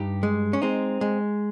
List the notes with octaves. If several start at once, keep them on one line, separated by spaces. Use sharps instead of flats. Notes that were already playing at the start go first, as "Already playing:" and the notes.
Already playing: G2 D#4 G4
G#3
C#4
G#3 C4 D#4
G#3